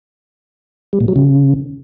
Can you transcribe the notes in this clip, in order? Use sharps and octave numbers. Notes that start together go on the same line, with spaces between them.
G3
A#2
F#3
C#3